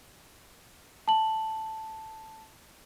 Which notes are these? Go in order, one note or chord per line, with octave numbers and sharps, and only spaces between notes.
A5 F#7